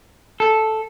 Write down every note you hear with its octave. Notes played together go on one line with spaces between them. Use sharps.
A4